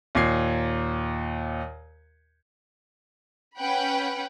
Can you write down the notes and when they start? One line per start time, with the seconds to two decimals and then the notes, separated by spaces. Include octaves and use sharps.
0.15 D#2 A#2 G#6 C7
3.58 C#4 B4 F#5 G5 B5